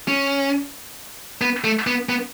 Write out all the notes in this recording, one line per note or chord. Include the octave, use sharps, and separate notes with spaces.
C#4
B3
A3
B3
B3